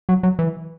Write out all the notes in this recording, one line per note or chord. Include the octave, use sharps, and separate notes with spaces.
F#3
F#3
E3